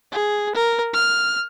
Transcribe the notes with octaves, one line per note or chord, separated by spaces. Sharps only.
G#4
A#4
F6